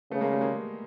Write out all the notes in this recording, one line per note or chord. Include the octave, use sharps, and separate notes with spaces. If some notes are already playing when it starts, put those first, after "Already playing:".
C#3 A3 B3
G#3 A#3
G3 A3
G#3 A#3